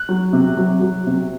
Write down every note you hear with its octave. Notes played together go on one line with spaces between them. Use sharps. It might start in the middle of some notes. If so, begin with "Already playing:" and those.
Already playing: F#6
F#3
C3
F#3
F#3
C3